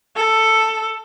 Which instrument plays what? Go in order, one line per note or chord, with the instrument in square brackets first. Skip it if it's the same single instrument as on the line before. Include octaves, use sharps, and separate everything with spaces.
[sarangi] A4